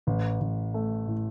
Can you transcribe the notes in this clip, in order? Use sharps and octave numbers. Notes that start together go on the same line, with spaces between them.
A1
A1
A3
A2